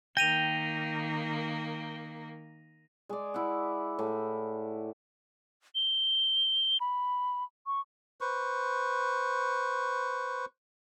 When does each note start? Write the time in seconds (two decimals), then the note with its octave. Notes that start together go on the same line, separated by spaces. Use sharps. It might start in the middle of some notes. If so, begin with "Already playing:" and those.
0.17 D#3 A#3 G5 A#6 D#7 F7
3.09 G#3 D5
3.34 E4 E5 F#5
3.99 A2
5.75 G7
6.81 B5
7.67 C#6
8.21 B4 C5 C#6